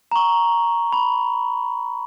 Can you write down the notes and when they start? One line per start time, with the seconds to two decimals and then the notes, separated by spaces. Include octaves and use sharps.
0.12 A#5 C#6
0.93 B5